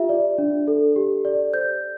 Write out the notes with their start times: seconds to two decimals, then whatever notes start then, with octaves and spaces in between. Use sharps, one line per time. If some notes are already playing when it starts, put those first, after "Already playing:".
Already playing: F4 G4 E5
0.09 D5
0.38 D4
0.67 A4
0.96 G4
1.25 D5
1.53 C5 G6